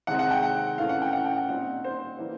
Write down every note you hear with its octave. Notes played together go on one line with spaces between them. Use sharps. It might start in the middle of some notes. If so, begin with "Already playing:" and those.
C3 D#3 G#3 C4 D#4 F#5
F#5
G5
F#5
A2 E3 A3 C#4 F5
F#5
G5
F#5
G5
F#5
A#2 G3 C4 D#4 F#5
C5
E3 G3 A#3